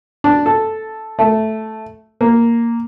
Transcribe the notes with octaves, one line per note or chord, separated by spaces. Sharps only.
D4
A4
A3
A#3